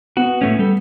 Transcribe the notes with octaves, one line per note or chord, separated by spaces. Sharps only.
B3 F#4
A2 A3 C#4
G3 A4